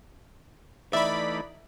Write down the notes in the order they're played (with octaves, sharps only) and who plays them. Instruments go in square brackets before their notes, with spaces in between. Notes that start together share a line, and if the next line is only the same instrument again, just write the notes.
[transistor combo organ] E3 A3 D#4 [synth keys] D5 B5 [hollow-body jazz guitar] E5